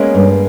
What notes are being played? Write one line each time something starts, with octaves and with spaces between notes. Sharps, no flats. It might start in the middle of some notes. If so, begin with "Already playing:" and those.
Already playing: G#3 A#3 B3 C#4
G2